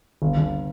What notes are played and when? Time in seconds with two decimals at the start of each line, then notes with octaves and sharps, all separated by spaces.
0.22 G1
0.37 G1